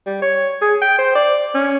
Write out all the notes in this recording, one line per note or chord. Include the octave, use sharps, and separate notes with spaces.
G3
C#5
G#4
G5
C5
D5
C#4